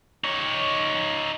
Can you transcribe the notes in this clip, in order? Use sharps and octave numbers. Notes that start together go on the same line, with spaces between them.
D#4 C#5